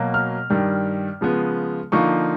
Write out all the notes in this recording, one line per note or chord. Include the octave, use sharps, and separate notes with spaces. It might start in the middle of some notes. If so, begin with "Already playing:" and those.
Already playing: B2 F#3 A#3
F6
G2 D#3 G3
C#3 F3 G#3 B3
D3 F3 A#3 D#4 C#6